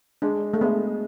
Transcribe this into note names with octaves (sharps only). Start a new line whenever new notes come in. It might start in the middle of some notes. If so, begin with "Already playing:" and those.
G#3 D4
A3
G#3 B3